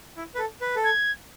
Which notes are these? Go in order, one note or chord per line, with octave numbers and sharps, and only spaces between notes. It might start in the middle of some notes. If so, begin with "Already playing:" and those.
E4
B4
A4
B4
A4
G#6